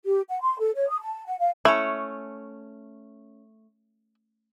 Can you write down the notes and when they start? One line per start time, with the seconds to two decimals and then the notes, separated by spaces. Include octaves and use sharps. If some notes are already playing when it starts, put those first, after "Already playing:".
0.04 G4
0.29 F#5
0.41 C6
0.59 A4
0.75 C#5
0.89 D#6
1.01 A5
1.26 F#5
1.39 F5
1.65 A3 C#4 E4 C#5